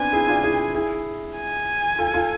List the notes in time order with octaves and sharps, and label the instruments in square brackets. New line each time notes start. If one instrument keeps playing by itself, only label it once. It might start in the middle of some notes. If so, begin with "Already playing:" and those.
Already playing: [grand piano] B3 C4 D4 [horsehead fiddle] G#5
[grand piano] E4 G#4
D4 F4
E4 G#4
E4 G#4
[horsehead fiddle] G#5
[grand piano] F4 A4
F4 A4